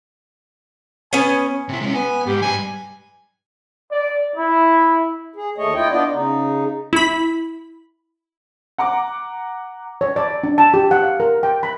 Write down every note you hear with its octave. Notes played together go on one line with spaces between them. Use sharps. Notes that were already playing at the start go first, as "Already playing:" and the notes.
B3 C#4 G#5
C3 E4
G#3 C#4
B3 G#5
G#2 G4
G2 B4 G#5
D5
E4
G#4
D#2 A3 C#5 D#5
E4 F4 D#5 G5
B3 D4 F4 D5 D#5
C#3 D#4
E4 B5
F#5 A#5 D6
C#5
D5
D4
A5
G4
F#5
F5
A#4
G5
B5